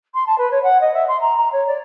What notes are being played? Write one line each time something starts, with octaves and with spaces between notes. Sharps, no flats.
C6
A5
B4
C#5
F#5
D#5
E5
C6
A#5
A#5
C#5
D5